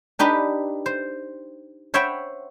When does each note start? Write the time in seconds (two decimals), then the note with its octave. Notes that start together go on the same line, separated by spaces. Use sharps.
0.19 D4 D#4 G4 B4
0.86 C5
1.94 C5 C#5 E5 F#5 G5 B5